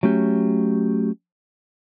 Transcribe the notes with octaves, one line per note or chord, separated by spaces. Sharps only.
F#3 A3 C#4 G4